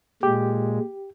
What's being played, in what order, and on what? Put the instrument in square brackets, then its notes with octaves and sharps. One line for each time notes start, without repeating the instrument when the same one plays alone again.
[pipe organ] A#2 G#3 [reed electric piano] G4